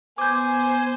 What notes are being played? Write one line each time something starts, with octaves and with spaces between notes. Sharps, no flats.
B3 C5 G#5 D6 G6